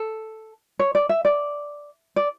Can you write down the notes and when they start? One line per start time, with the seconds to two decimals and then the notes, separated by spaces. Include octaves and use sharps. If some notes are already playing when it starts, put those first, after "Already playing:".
Already playing: A4
0.79 C#5
0.95 D5
1.09 E5
1.25 D5
2.16 D5